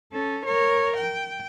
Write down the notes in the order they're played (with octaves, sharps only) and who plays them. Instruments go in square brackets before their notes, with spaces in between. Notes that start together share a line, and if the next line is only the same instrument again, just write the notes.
[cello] C#4 A4
A#4 C#5
G5